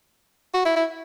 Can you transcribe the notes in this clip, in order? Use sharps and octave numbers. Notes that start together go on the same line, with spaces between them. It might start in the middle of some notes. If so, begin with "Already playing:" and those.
F#4
E4
E4